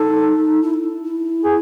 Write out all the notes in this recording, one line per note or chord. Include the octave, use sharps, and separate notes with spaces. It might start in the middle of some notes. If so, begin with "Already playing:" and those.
Already playing: D#4 A4
E4
D#4
E4
E4
G#4